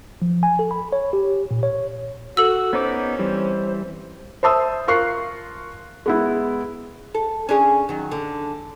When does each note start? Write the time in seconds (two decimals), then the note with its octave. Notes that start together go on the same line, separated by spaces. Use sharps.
0.22 F3
0.43 G#5
0.59 A4
0.71 B5
0.93 C#5
1.13 G4
1.51 A#2
1.63 C#5
2.37 F#4 A4 E6
2.73 B3 C#4 D#4 C5 D6
3.19 E3 G3 C4
4.43 C5 E5 A5 D#6 E6
4.88 F4 A#4 C#6 F#6 C7
6.06 G#3 B3 E4
7.15 A4
7.49 C#4 D4 G#4
7.89 D#3 F#3
8.11 D3